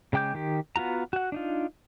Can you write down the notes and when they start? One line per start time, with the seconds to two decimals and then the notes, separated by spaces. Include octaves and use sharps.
0.13 C#3 G#3 G5 D6 G6
0.34 D#3 G4
0.76 B3 F4 F#4 A#5
1.13 F#4 F#5
1.32 D4 D#4 F4